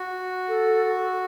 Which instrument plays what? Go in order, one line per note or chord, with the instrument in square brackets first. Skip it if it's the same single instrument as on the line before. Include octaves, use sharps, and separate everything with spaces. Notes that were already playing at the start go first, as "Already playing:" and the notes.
Already playing: [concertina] F#4
[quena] A4